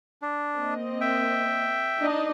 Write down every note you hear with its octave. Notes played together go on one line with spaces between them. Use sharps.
D4
A#3 C4 D#5
E5 G5
D4 D#4 D#5